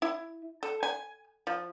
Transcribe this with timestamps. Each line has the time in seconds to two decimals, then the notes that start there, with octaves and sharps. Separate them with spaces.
0.02 E4
0.63 A4
0.83 G#5
1.47 F3